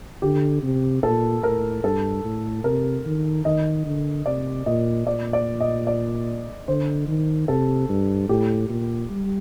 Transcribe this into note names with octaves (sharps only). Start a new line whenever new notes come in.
D3 G4
C3
A#2 A4
A2 A#4
G2 A4
A2
C3 A#4
D#3
D#3 D#5
D3
C3 D5
A#2 D#5
A#2 D5
D5
D#5
D5
D3 C5
D#3
C3 A4
G2
A2 G4
A#2
G3